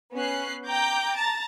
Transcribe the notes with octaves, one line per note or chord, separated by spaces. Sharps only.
B3 C#4 F#6 C7
G5 A#5 D6 G6
A5 A#5 A6